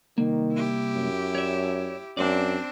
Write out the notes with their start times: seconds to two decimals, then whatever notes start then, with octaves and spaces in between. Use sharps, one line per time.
0.18 C2 D#3 A#3
0.52 E4 G4
0.95 F#2
1.35 C#5 D5 E5
2.17 F#2 C4 D4 D5